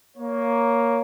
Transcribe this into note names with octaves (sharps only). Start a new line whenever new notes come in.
A#3 C#5